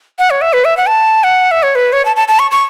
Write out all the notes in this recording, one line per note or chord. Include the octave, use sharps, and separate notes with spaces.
F#5
C#5
E5
B4
E5
F#5
A5
F#5
E5
C#5
B4
C#5
A5
A5
A5
C#6
C#6